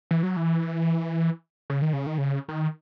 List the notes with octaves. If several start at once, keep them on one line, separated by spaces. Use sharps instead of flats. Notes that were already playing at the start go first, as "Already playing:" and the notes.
E3
F#3
E3
C#3
D#3
C#3
D#3
C#3
D#3